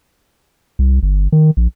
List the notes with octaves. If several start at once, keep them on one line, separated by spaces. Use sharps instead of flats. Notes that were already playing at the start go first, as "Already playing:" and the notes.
C2
G1
D#3
A#1